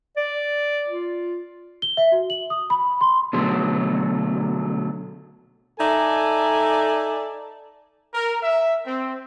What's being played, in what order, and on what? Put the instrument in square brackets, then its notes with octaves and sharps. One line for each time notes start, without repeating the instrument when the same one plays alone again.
[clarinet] D5
F4
[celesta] G7
E5
F#4
F#7
D#6
B5
C6
[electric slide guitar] B2 D3 F#3 A3
[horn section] D#4 A4 D5 E5 G#5
[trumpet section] A#4
E5
C4